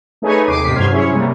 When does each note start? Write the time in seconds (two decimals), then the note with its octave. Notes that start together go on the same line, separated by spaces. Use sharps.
0.22 A3 D#4 G#4 B4 C#5 G#5
0.48 D#2 C3 D#4 D6 C7 D#7
0.64 F#2 A2 C3 B6 C7
0.76 G2 F#3 C5 C6 F6 G#6
0.90 C#4 E4 G#4 C#5
1.12 C3 G3 A#3